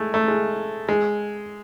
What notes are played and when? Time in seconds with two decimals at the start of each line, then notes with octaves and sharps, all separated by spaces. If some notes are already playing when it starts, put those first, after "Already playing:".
Already playing: G#3 A3
0.14 A3
0.28 G#3
0.89 G#3